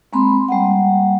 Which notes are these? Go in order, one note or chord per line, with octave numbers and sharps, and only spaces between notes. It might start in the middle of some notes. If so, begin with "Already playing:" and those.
G#3 A#3 C4 B5 C6
G3 A#3 F#5